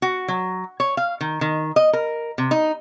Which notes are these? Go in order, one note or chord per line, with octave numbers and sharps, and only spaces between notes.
F#4
F#3
C#5
F5
D#3
D#3
D#5
A#4
C3
D#4